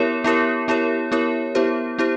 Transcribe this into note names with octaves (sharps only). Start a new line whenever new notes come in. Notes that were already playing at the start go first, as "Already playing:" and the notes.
Already playing: B3 E4 G4 A#4 C#5
B3 E4 G4 A#4 C#5
B3 E4 G4 A#4 C#5
B3 E4 G4 A#4 C#5
B3 E4 G4 C5
B3 E4 G4 C5